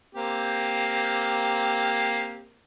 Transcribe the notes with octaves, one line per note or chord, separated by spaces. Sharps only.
A#3 C4 G4